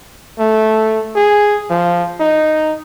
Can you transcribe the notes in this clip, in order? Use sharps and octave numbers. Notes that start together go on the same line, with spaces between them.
A3
G#4
F3
D#4